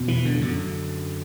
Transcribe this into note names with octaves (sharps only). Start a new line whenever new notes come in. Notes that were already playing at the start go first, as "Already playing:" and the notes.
Already playing: E2 B2
E3
D3
F#2 D3